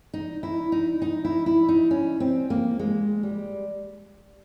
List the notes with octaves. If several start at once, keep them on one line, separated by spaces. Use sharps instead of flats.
D#4
E4
D#4
D#4
E4
E4
D#4
C#4
C4
A#3
G#3
G3